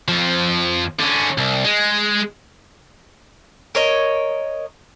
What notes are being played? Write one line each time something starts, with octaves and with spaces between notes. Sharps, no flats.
F2 F3
D3 C#4
C2
G#3
A#4 C#5 D#5